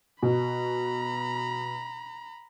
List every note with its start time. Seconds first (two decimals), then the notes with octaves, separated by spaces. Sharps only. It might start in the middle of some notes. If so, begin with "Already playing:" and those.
0.23 B2 A#5 B5